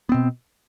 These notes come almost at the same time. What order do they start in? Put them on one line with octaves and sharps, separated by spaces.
B3 C4 B2